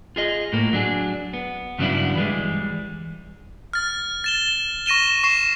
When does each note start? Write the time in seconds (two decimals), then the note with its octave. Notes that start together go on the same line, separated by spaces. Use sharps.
0.16 F4 G#4 D#5
0.53 A2 A#3
0.73 F#3 D4 G#4
1.33 B3
1.78 G2 C#3 F#3 B3 D4 E4
2.15 E3 G3 G#3
3.73 F6 A6
4.24 A6 E7 G7
4.86 C#6 A#6 D#7 E7 G7
5.24 C#6 A#6 C7 E7